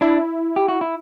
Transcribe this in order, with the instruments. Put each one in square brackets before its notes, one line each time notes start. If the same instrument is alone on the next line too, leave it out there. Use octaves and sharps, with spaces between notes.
[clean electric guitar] D4 [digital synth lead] E4
[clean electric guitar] G4
F#4
E4